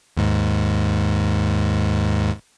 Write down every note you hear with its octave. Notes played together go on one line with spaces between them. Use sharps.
D#2 G#2